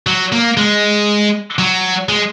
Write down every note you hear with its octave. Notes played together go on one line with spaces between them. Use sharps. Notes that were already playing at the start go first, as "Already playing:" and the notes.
F#3
A#3
G#3
F#3
G#3